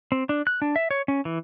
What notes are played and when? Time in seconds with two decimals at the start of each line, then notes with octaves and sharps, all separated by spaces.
0.12 C4
0.29 D4
0.47 F#6
0.62 D4
0.76 E5
0.91 C#5
1.08 C#4
1.25 E3